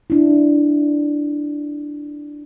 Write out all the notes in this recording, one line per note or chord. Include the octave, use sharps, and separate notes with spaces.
D4 E4